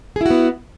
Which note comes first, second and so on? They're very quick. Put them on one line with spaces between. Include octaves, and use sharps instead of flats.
G#4 E4 F#4 B3